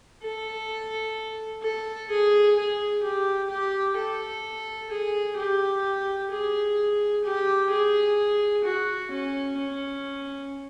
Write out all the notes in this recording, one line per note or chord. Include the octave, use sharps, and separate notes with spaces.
A4
A4
G#4
G#4
G4
G4
A4
G#4
G4
G#4
G4
G#4
F#4
C#4
C#4